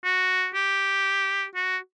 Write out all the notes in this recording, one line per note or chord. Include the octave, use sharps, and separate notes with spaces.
F#4
G4
F#4